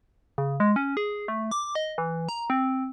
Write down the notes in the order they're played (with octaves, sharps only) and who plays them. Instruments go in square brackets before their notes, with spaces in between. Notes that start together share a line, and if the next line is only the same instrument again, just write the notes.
[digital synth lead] C#3
G#3
C#4
G#4
A3
D6
D#5
E3
A#5
C4